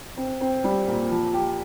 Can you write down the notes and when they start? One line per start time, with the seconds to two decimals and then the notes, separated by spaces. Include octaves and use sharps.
0.17 C4
0.41 C4
0.64 G3
0.87 A#2
1.11 F3
1.33 G4